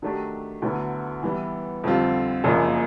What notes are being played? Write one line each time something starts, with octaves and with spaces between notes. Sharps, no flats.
D#3 F#3 A3 D4 G4
D2 D3 F#3 B3 E4
E3 G3 B3 E4
F2 D3 G3 C4 F4
F#1 F#2 C#3 F3 A#3